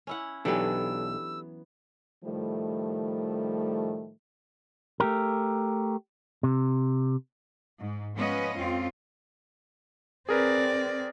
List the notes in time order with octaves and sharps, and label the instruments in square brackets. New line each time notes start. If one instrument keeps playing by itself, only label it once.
[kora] C#4 E4 F#5
[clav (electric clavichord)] B1 [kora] E3 F#3 B3 [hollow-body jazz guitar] D4 G4 A4 [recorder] E6
[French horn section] A2 D#3 F3 G3 A3
[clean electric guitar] A3 G4 A#4
C3
[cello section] G#2
F3 G#3 B3 C#4 B4 D#5
F2 C4 C#4 F4
[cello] C4 D5 [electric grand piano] G#4 A#4 B4